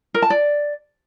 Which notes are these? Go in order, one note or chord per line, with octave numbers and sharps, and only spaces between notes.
A#4
A5
D5